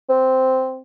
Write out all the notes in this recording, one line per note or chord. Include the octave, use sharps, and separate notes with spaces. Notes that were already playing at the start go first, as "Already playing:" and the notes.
C4